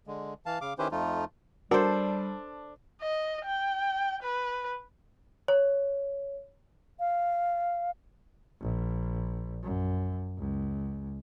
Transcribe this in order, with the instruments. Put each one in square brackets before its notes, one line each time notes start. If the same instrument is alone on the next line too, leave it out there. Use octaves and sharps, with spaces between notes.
[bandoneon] D3 G#3
E3 F5 A5
C#3 F5 D6
D#3 C#4 E4 G4 B4 C5
F2 F3 A3 D#4 F4
[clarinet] G3 [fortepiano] D4 [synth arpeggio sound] F#4 A#4 A5 [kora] A4 C5
[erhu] D#5
G5
B4
[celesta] C#5
[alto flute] F5
[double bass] A#1
F#2
C#2